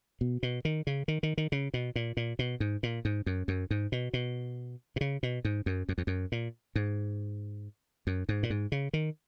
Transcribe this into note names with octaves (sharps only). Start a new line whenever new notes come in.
B2
B2
D#3
C#3
D#3
D#3
D#3
C#3
B2
A#2
A#2
B2
G#2
A#2
G#2
F#2
F#2
G#2
B2
B2
B2
C#3
B2
G#2
F#2
F#2
F2
F#2
A#2
G#2
F#2
G#2
A#2
G#2
C#3
D#3